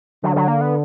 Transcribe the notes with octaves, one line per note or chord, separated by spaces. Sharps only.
D3 F#3
F#3
A#3
B3